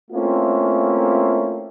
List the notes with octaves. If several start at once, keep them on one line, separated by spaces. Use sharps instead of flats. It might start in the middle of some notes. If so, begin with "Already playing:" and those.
A3 A#3 C4 C#4 E4 F4